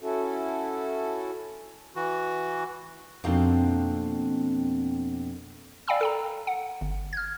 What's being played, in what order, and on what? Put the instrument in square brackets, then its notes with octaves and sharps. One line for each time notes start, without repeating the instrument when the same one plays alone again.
[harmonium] C#4 E4 F#4 A4
[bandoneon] E3 F#4
[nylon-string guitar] F2 B2 A#3 C4 D4 D#4
[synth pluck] D5 F5 G5 G#5 B5 E6
A4 G5 A#5
F#5
G1
F6 G#6